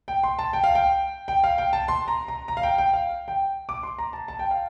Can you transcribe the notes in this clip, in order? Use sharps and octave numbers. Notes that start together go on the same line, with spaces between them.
G5
C6
A5
G5
F5
G5
G5
F5
G5
A5
C6
A#5
A#5
A#5
F5
G5
G5
F5
G5
D6
C6
A#5
A5
A5
G5
F5